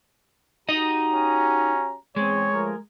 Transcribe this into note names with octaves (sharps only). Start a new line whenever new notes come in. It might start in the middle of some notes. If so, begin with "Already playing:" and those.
D#4 F#4 G4 D#5 A#5
C#4
E2 G#3 C4 C#5
F3 A3 A#4